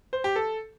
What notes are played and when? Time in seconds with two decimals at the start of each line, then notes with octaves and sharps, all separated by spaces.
0.13 C5
0.24 G4
0.36 A4